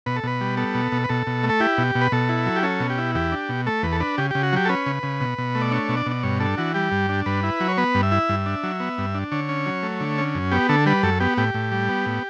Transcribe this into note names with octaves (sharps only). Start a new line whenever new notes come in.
B2 B4
A4
B2 B4
G3
B3 A4
B2
B2
B4
B2 A4
B2
A3
A4
E4 G4
B2
B2
B4
B2 A4
E4
F#3
G4
C#4 A4
B2
G4
E4
E2 G4
D4
B2
A3 A4
E2 B4
A4
D4 B4
C#3 G4
C#3 G4
F#4
F#3 G4
A4
C#4 B4
C#3
C#3
B2
B2
A3
D5
D4 C#5
B2
D5
B2
D5
G2 C#5
D4 A4
E3 F#4
G3 G4
G2
D4
G2 B4
E4
F#3
C#5
B3 B4
G2
E5
E4
G2
D4
F#3
B3
G2
D4
D3 C#5
C#4
F#3
A3
D3
C#4
F#2
B3 G4
D3 A4
G3 B4
F#2 A4
B3 G4
A2 G4
A2
G3
B3
A2